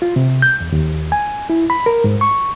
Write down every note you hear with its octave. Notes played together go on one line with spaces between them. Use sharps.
F4
C3
G6
E2
D#2
G#5
E4
B5
A#4
G#2
C#6